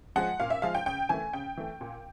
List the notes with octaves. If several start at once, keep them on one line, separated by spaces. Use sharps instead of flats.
F3 G#3 F#5
A#2 F5
E5
F3 G#3 F5
G5
C#3 G5
E3 A3 G#5
C#3 G5
E3 A3
A#2